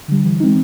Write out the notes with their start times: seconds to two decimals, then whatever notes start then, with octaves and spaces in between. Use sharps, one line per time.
0.08 D3 G3
0.25 E3
0.40 G#3 C4 D#4